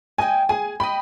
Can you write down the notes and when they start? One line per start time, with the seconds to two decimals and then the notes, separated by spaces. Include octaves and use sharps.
0.18 D#5 G5 G#5
0.49 G#4 G#5
0.80 D#5 G5 B5